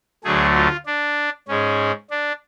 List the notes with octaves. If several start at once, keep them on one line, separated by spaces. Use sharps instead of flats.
D2 D3 F#3 A3 G#4
F4
D4
G#2 G#3 C#4
D4